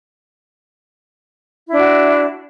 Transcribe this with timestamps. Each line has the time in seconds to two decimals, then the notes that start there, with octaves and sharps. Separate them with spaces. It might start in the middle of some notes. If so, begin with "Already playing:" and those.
1.67 E4
1.72 D4
1.77 F#4